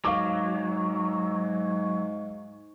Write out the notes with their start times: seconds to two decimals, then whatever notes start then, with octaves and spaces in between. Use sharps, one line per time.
0.05 G#2 F#3 F5 D6